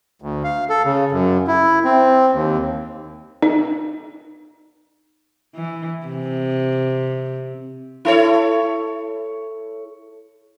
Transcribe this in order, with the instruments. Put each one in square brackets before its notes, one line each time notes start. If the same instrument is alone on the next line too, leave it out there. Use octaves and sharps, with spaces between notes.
[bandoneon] D2
F5
A4
C#3
F#2
E4
C4
D#2
[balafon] D#4
[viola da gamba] E3
C3
[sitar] E4 A4 C#5